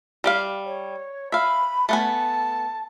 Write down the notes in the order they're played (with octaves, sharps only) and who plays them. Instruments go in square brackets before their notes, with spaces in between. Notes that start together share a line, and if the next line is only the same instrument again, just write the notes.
[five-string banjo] G3 G4 F5
[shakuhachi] C#5
[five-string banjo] E5 F5 [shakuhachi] B5
[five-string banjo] A3 B3 G#5 [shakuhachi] A5